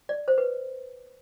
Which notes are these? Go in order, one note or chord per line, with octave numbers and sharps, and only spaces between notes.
D5
C5
B4